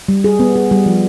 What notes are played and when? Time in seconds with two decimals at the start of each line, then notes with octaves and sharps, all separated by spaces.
0.09 G3
0.24 G#4
0.40 B3
0.56 G#4
0.71 G3
0.86 F3